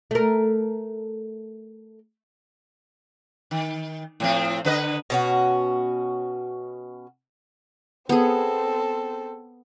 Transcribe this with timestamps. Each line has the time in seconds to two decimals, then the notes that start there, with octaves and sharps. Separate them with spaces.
0.11 A3 A#4
3.51 D#3
4.20 A2 F3 C4
4.65 D3 B4 D#5
5.10 B2 C#4 F#4
8.09 B3 C4 G#4 A4